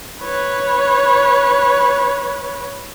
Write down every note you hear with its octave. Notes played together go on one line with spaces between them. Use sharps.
B4 C#5